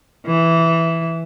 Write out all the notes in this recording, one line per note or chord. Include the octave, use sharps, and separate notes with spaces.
E3